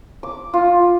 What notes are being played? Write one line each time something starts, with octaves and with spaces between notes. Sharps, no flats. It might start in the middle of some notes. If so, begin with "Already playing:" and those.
D6
F4